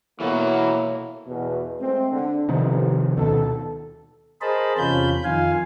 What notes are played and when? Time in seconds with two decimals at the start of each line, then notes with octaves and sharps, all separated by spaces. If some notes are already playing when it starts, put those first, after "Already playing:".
0.20 B2 E3 A#3 E4 F#4 A4 C#5
1.27 E2 B2
1.80 G#3 A3 C4
2.11 D3
2.49 A1 C3 D#3 F3
3.17 D2 B2 D#3 A4
4.41 G#4 A#4 C5 D#5 A5 B5
4.78 E2 C3 C#4 F4 B5 G6
5.24 F2 D#3 F4 F5 G#5